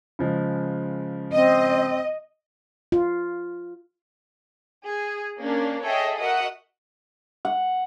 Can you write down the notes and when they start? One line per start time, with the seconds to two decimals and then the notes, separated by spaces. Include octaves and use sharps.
0.19 C#3 F3 G#3
1.33 C4 D#5
2.92 F4
4.85 G#4
5.40 A#3 C#4 D4 A#4
5.85 G#4 A4 C#5 D#5 E5 G5
6.18 F#4 A#4 D#5 E5 F#5 D#6
7.45 F#5